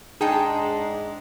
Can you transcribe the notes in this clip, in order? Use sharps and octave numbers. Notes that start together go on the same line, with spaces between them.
G#2 G#3 D4 D#4 G#4 G5 A5